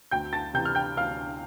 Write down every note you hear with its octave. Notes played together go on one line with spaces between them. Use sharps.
D2 G5 G6
A5 A6
C3 E3 G5 G6
F6
G5 G6
D2 F5 F6